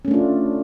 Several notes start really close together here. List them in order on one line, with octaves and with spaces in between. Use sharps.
C#4 A3 D4 F4